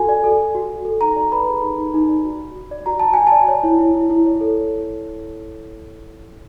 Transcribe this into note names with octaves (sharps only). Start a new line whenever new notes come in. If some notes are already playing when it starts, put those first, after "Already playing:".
Already playing: F#4 A4 G#5
D5
A4
A4
F#4
F#4
A4
D#4 A#5
D5
B4 B5
G#4
D#4
D#4
D#4
D5
F#4
F#4
F#4
D5
F#4 A#5
F#4 A5
F#4 G#5
A5
D5
C#5
E4
E4
E4
E4
C#5
A4